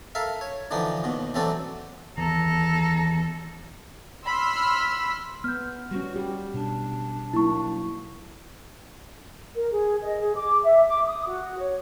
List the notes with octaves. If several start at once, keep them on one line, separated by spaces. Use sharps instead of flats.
A4 A#4 E5 F5
C#5
D3 E3 F3 D4 D#4
D#2 B2
A1 E3 F#3 C4 D4 A4
D#2 E3 B3 A4 A#5
B5 C6 E6 F6
B3 F6 G6
G3 C#4 F#4
G3 G4
B2 D4
F#3 A#3 D#4 E4 C#6
A#4
G#4
D#5
G#4
D6
E5
D6
D#6
F#4
C#5